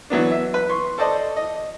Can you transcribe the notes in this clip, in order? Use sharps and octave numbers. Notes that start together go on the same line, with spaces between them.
E3 F#3 B3 D4
E5
B4
C6 C#6
A4 C5 D5 D#5 A5
D#5